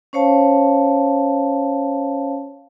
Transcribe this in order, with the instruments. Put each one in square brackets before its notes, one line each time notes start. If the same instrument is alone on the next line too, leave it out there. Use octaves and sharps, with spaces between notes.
[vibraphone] C#4 C5 C#5 F5 A5